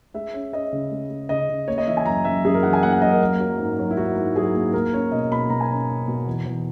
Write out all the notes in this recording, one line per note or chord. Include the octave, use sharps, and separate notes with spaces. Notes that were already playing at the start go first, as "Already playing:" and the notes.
G#3 E5
C#4
C#4 D#5
C#3
G#3
G#3
C#3 D#5
C#3
A#3 C#5
D#5
E3 E5
G#5
F#2 A#5
F#2 E5
F#2 G#4
A#4
E3 F#5
G#5
A#3 F#5
F#5
F#2 D#5
A#4
A#3
F#3
G#2
F#3
E4
G#2 F#4
G#2
F#3 G#4
A#3
A#3 A#4
C#4 C#5
B2 D#5
B2 B5
B2 A#5
G#5
C#4 A#5
C#4
B2
E2
E2